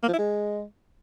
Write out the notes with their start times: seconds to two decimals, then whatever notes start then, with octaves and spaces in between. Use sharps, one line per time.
0.03 A#3
0.08 F3
0.13 E4
0.18 G#3